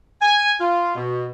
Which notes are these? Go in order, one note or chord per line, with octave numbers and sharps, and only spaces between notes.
G#5
F4
B2